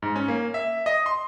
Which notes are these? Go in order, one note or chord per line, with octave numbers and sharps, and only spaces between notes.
G#2
C#4
A#3
E5
D#5
C6